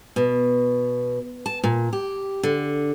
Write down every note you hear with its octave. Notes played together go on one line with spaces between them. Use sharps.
B2
A5
A#2
G4
D3